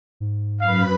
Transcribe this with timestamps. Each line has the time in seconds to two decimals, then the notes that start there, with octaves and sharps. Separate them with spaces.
0.20 G#2
0.60 F#2 B4 F5 B5